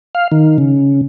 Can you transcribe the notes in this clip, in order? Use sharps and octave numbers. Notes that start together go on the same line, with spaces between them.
F5
D#3
C#3